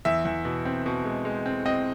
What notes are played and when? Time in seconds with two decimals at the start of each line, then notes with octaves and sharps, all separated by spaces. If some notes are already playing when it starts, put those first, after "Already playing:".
0.05 E2 E5
0.25 E2
0.45 B2
0.65 C4
0.86 B2
1.05 G#3
1.25 G#3
1.46 C4
1.66 C4 D#5